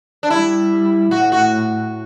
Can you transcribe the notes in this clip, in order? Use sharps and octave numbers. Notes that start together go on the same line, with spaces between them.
D4
G3 E4
A2 F#4
F#4